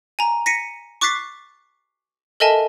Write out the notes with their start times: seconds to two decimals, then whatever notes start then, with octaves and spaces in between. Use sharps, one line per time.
0.19 G#5 A#5
0.46 A#6 B6 C#7 D#7
1.01 C#6 D6 F#6 A6 B6 C7
2.40 A4 A#4 D#5 E5 G#5 A5